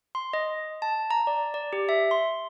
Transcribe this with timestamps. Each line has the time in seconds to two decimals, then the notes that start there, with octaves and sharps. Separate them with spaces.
0.15 C6
0.33 D#5
0.82 A5
1.11 A#5
1.27 D5
1.54 D5
1.73 G4
1.89 E5
2.11 C6